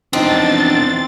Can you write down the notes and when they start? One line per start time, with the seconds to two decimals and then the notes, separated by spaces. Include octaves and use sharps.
0.13 E2 F3 C4 D4 D#4 A6